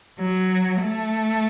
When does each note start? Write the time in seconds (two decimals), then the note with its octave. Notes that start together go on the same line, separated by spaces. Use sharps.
0.19 F#3
0.82 A3